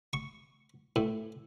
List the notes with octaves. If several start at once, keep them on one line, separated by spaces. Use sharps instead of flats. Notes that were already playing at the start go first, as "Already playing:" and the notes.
C#6
A2